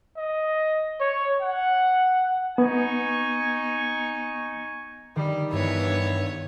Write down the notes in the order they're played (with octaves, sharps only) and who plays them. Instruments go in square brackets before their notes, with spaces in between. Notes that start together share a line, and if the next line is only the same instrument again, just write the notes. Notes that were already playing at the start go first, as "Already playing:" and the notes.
[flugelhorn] D#5
C#5
F#5
[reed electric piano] B3 [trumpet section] D#4 G#5 C#6
[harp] D#3 [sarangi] G3
[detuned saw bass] G2 [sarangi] E3 [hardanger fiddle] B3 C#5